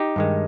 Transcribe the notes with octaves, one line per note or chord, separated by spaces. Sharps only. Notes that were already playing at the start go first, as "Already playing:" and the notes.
Already playing: D#4 G4
G2 D#3 G#3